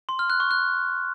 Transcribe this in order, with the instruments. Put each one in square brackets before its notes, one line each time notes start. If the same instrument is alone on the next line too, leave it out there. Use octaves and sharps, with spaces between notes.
[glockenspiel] C6
F6
F#6
C#6
F#6